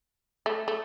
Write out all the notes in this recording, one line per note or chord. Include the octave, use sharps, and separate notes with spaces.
A3
A3